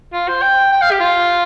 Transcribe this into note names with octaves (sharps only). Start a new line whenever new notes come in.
F4
C5
G5
G5
F5
G4
F4